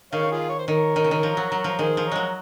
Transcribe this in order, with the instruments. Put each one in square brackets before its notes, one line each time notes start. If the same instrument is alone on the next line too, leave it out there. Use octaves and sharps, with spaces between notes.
[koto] D#3 [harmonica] C#5 F5
[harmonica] F4 G#4
C#5
C5
[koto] D#3 [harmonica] A#4 C#5
[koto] D#3
C#3
D#3
F3
F#3
F#3
F3
[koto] D#3 [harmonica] G#4 C5
[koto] F3
[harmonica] A#4 C#5
[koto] F#3 G#3